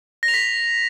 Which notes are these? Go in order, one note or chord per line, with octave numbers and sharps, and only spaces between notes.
A#6
F7
B6